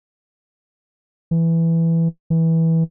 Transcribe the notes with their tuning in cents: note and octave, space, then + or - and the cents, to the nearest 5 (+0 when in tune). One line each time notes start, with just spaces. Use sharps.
E3 +5
E3 -15